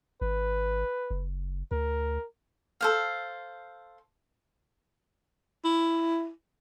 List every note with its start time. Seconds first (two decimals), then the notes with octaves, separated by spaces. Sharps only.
0.22 G#1 B4
1.11 F#1
1.71 D2 A#4
2.81 A4 C5 F5
5.65 E4